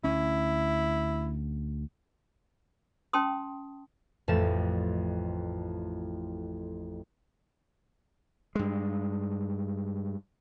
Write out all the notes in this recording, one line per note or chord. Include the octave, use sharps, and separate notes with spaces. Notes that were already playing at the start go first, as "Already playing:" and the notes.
D2 C#4 E4
C#4 G5 A5 C6 D#6
A1 F2 A2 F3 A3 E7
G2 G#3